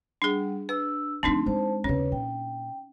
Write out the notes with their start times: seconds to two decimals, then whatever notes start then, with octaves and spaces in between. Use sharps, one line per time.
0.22 G3 D4 G#4 F#5
0.69 D4 B4 E6
1.23 D3 F3 A3 C4 D4 D#4 C6
1.46 G#3 C5 A5
1.84 D#2 C#3 C#4 B4 C#5
2.12 A#2 G5